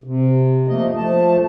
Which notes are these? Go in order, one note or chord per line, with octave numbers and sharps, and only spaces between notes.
C3
F3 A3 A#3 D#5
F3 A3 A5